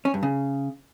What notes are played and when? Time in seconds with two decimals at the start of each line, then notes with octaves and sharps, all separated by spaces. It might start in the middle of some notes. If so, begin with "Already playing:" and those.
0.05 C#4
0.14 G2
0.23 C#3